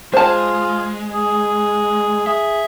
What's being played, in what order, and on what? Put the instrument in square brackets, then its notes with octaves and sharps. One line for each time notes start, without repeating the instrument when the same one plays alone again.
[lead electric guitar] G#3 [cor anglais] F4 [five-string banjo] C5 A5
[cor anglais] G#4
[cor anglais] G#4 [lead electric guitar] E5